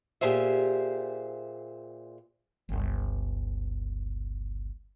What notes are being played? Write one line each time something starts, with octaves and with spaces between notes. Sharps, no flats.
A#2 G4 G#4 C5 E5
G1 C#2